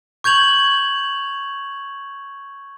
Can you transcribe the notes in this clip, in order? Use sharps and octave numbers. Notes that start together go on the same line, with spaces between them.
C#6 G6 G#6 F7 F#7